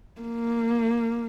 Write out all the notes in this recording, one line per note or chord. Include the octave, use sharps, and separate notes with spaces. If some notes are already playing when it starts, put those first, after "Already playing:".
A#3